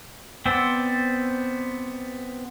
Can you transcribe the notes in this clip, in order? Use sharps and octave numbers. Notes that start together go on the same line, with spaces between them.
B3 C4 C5 D5 E6